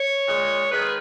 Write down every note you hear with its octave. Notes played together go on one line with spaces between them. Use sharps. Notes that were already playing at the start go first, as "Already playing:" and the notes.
Already playing: C#5
A#2 G#3
D#3 G#3 B4
G#4